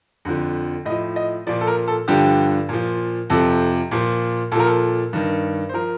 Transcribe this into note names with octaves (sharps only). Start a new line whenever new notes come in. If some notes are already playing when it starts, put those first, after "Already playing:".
F2 D3 F3
A2 F3 D#5
D#5
A#2 F3 D5
A4
A#4
A4
G2 D3 F3 G4
A#2 F3
F2 C3 F3 A4
A#2 F3
A#2 F3 A4 A#4
A4
G2 D#3
C5
F3 A#4